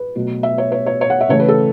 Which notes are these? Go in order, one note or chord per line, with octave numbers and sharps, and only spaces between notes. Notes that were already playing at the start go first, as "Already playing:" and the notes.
Already playing: B4
B2 F#3 A3
E5
C#5
C#5
C#5
C#5
F#5
E5
C#3 E3 A3 C#5
B4
A4